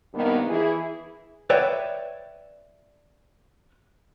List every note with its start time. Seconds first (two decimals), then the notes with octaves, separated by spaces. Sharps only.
0.14 G2 C3 D#3 A#3 B3
0.48 E3 E4 G#4
1.50 B4 C#5 D5 E5 F#5 G5